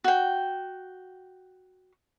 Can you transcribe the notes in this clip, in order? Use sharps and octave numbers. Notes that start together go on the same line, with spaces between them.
F#4 G5